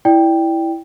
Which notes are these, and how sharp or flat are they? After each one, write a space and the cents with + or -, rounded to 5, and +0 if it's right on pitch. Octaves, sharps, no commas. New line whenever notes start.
E4 +0 D5 +0 G5 +0